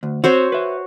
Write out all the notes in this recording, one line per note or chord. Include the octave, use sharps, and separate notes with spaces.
D2
C4 F#4 C5 C#5
B4 E5